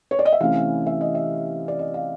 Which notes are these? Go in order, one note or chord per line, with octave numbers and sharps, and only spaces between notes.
C#5
D5
D#5
E5
C3 E3 A3 C#4 E4 F5
E5
D#5
E5
D5
D#5
F5